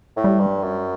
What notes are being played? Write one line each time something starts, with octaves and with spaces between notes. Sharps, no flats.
A2
G3
G2
F#2